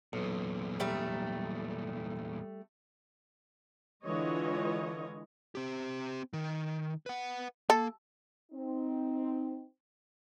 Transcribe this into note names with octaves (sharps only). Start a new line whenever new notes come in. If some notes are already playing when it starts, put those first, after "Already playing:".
B1 E2 A#2
G3 A3 A#5
D3 E3 G#3 F4 C#5 D#5
C4 G4
D#3
B4 F#5
A#3 A4
C4 D#4